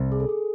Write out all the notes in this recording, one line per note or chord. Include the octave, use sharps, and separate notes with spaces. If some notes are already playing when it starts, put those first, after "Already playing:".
Already playing: C2
G#4
A4
G#4